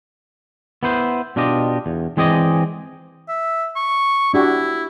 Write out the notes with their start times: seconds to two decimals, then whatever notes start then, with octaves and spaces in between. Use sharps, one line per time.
0.83 B3 E4 B4 C5
1.36 B2 D4 F4 G4 D#5
1.86 E2
2.17 E3 G#3 C4 G#4 D5 D#5
3.29 E5
3.76 C#6
4.34 D4 E4 F#4 G4